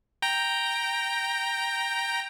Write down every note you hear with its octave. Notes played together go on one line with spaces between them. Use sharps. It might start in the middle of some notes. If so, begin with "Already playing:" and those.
G5 A#5